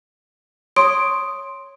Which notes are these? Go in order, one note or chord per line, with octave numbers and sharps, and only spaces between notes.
C#5 C6 C#6 D#6 D7